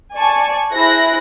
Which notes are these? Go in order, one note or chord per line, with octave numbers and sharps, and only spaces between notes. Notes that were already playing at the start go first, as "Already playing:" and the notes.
D5 G#5 A5 C#6
E4 G#4 C5 F#6 A#6